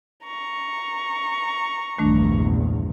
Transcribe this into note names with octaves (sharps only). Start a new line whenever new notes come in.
A#5 C#6
A#1 E2 G2 D#3 A3 D4